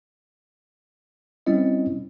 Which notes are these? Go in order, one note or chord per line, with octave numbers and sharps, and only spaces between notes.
G3 C4 C#4 E4 D#5